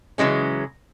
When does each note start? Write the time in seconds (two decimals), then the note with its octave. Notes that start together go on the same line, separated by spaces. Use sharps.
0.18 C#3 E3 F#3 G#3 C#4